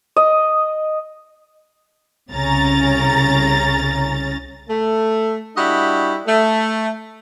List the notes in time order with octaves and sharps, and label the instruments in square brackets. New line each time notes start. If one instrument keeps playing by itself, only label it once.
[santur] D#5
[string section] C2 C#3 C#4 A#5 A6
[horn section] A3
G3 D4 E4 F#4 D#5
A3